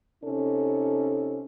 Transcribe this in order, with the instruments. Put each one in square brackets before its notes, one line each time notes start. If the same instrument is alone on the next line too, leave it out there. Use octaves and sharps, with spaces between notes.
[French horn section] C3 C#4 D#4 A4